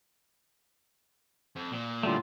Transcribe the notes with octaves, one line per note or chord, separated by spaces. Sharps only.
F2
A#2
D3 F#3 G3 A3 E4 F4